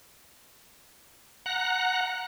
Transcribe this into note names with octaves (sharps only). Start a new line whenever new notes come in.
F#5 A#5 F#6